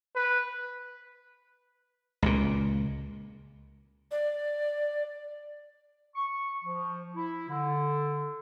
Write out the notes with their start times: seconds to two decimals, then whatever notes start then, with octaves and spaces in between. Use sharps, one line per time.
0.16 B4
2.22 C#2 A#2
4.11 D5
6.15 C#6
6.64 F3
7.16 E4
7.49 D3